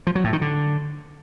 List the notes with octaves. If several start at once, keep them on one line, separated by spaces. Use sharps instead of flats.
F3
F#3
A2
D#3
D3